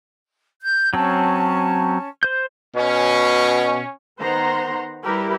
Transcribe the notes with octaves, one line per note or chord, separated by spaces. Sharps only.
G6
F#3 C4 C#4 A5
C5 G6
B2 C#4
D#3 B3 C5 F#5 A#5 C6
G3 E4 G4 A#4 B4